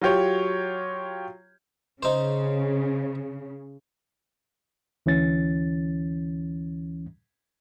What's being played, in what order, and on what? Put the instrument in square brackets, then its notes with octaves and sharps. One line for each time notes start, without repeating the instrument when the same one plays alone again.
[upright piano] F#3 F4 G4 C#5
[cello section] C#3 [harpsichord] D#4 C5
[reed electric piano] D2 E3 C#4 A6